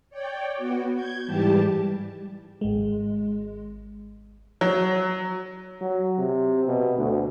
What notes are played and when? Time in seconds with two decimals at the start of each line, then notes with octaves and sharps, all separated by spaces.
0.10 C#5 D5 G5
0.55 B3 F#4
0.95 G6 G#6
1.26 G#2 E3 G3 G4 A5
2.61 G#1 G#3
4.61 F#3
5.81 F#3
6.18 C3
6.67 B2
6.97 D2